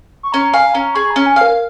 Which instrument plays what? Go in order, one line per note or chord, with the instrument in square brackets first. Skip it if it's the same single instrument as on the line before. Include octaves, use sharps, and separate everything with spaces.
[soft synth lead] C#6
[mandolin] C#4 [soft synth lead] A#5
[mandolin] F5 [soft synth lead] G#5
[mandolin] C#4 [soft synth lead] A#5
[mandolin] G#4 [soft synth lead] C#6
[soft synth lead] A#5
[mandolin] C#4
[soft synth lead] G#5
[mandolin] F5
[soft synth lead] A#4